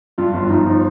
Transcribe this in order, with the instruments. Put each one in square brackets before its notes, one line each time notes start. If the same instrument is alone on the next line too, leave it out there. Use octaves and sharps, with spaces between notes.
[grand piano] G2 [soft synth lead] F4
[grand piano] G1 [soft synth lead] F4
[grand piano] G1 [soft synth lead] D#4
[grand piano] F3 [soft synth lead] D#4